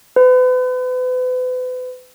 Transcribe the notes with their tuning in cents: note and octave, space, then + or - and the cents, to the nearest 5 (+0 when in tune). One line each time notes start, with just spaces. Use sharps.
B4 +40